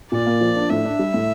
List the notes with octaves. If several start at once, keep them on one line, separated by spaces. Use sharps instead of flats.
A#2 D5
A#3
F3
D4
A2 E5
D4
G3
A2